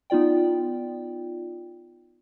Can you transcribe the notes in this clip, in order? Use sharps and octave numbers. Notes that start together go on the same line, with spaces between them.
B3 D#4 F4 D5 G5